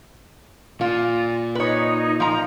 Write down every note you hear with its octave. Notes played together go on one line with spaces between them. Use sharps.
A#2 F4
D#4 B4 C#5
F3 A#5